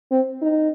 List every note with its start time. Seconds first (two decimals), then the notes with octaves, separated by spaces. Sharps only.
0.11 C4
0.42 D#4